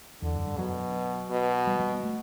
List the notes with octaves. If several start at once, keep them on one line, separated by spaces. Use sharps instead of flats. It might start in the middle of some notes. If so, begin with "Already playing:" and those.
E2 D3
F#2
G2
B2 F#3
B2
G3
G3
B3
A3